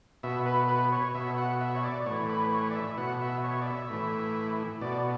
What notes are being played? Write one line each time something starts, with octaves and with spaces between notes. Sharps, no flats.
B2 E5
B4
B4
C#5
B2 E5
F#5
E5
C#5
D5
A2 E3 C#5
B4
C#5
D5
E5
B2 F#5
E5
C#5
D5
E5
A2 E3
B2 D5